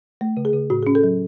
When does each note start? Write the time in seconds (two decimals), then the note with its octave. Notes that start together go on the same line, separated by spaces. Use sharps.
0.21 A3
0.37 C#3
0.45 G#4
0.54 C#3
0.70 A2 F#4
0.83 C#4 G#4
0.95 A4
1.03 F#3